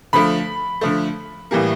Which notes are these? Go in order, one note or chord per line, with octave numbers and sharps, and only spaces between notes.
D3 F3 A3 B5
D3 F3 A3
A2 E3 G3 A#3